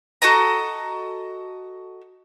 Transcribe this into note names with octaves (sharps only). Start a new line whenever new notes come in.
F#4 A4 D#5 A#5